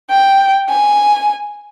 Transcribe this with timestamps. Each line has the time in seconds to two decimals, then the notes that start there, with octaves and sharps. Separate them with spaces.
0.10 G5
0.69 G#5